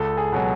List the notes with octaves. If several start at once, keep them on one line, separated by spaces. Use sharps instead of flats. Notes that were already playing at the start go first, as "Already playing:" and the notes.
Already playing: C#2 A4
G#4
B2 F#3